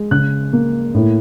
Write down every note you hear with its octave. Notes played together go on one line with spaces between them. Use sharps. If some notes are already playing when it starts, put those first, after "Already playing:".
Already playing: G#3
C#3 F#6
A#3
A2